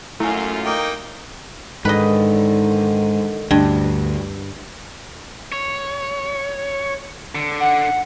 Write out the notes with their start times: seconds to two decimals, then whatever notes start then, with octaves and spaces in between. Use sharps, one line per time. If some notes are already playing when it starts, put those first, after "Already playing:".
0.20 F#2 A3 E4 F4 G#5
0.66 A#3 D#4 G5
1.85 G#2 D3 D#3 B4 D#5
3.51 D2 G2
5.52 C#5
7.35 D3
7.60 F#5